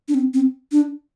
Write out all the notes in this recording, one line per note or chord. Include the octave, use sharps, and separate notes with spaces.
D4
C4
C4
D4